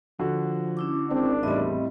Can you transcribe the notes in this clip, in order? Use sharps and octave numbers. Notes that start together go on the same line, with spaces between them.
D3 F3 F#4
C#4 E4 D6
G#1 C4 D4
E2 A2 G3 C4 D#5